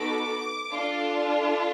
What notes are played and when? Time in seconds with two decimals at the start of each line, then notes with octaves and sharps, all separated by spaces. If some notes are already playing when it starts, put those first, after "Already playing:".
Already playing: B3 D#4 F#4 A4 D6
0.71 D4 F4 A4